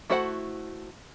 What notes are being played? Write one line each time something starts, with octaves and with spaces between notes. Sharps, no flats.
A3 E4 F#4 C5 F#5